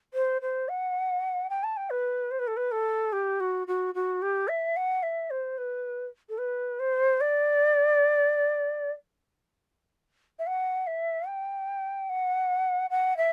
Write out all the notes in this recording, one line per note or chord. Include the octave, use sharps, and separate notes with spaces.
C5
C5
F#5
G5
A5
G5
B4
C5
B4
A4
B4
A4
G4
F#4
F#4
F#4
G4
E5
F#5
E5
C5
B4
A4
B4
C5
D5
E5
F#5
E5
G5
F#5
F#5
E5